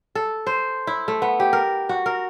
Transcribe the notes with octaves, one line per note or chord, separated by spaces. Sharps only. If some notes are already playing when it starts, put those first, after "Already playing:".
A4
C5
E4
A3
B3
G4
A#4
F#4
A#4